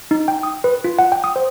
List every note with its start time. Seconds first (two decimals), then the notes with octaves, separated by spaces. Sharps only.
0.11 D#4
0.28 G5
0.43 D#6
0.64 B4
0.84 F4
0.99 F#5
1.12 G5
1.24 D#6
1.36 C5